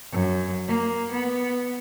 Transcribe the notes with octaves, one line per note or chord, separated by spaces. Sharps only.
F#2
A#3
B3